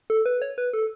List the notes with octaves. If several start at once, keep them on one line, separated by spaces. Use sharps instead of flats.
A4
B4
C#5
B4
A4